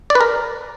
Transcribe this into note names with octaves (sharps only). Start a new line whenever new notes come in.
D5
B4
A#4